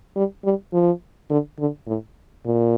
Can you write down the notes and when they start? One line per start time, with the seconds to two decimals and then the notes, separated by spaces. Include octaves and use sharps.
0.16 G3
0.44 G3
0.73 F3
1.30 D3
1.59 D3
1.87 A2
2.45 A#2